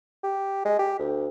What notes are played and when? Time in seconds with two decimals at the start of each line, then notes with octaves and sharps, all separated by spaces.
0.23 G4
0.65 G#3
0.79 G4
0.99 D2